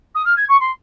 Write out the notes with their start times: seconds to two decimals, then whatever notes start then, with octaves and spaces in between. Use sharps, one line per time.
0.15 D#6
0.25 F6
0.37 G#6
0.49 C#6
0.60 C6